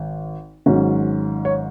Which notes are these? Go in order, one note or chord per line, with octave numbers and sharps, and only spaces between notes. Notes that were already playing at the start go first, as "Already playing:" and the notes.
Already playing: G#1
G#1 G#2 F#3 C#4
C#5